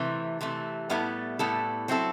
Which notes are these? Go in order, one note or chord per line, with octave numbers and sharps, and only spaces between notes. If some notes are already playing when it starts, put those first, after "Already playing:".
Already playing: C3 E3 A3
C3 E3 A3
A2 G3 B3 E4 A4
A2 G3 B3 E4 A4
F#3 C4 E4 A4